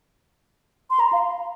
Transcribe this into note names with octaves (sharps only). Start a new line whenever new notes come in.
C6
A#5
F5